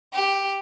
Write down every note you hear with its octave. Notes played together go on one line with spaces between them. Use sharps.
G4